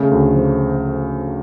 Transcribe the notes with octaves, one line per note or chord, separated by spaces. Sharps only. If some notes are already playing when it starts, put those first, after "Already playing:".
Already playing: C#3 A3
D2
F3